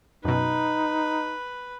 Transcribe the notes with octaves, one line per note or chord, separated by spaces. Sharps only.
F#2 B2 D#4 B4